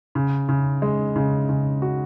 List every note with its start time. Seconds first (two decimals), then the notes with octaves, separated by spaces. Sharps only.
0.15 C#3
0.49 C#3
0.82 G#3
1.16 C#3
1.49 C#3
1.82 F#4